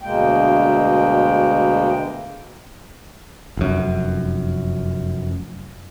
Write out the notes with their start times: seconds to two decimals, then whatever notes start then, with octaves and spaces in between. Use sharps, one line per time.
0.02 D2 B2 G#3 A#3 G5
3.57 F1 F#2